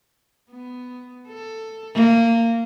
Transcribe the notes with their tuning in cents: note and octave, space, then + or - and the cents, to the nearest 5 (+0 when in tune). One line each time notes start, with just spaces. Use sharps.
B3 +10
A4 +10
A#3 -20